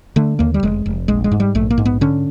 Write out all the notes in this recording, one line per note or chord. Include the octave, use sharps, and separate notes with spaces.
D3 A3
D#2 A#3
G3
F1 G#3
F1
A#1 G#3
G#3
G#2
G3
A#1 A3
A#3
G#2
B3
D3 C#4